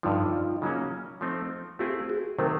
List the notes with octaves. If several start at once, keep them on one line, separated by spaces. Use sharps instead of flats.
G2 D3 F3 D#4 F4
C#3 F#3 A#3 C#4
F3 A3 C4 D#4
A3 C4 E4 F4 G4 G#4
F#4 G#4
C3 D#3 F#3 A3 A#4 C5